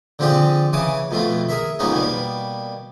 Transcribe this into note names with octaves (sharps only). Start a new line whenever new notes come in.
D3 F3 C4 G4 G#4 D5
C#3 E3 G#5 D6 D#6
F2 B2 A3 F4
G#4 A#4 E5
F2 G#2 A#3 B3 C#4 D#4
B2 G3 A#3